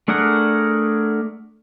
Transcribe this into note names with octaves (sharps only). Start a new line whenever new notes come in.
A3 D4 G#4 A#4 F#5